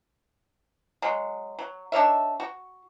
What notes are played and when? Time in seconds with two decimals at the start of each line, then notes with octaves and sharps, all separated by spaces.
1.02 F#3 G#3
1.59 F#3
1.92 D4 D#4 C#5 E5
2.40 F#4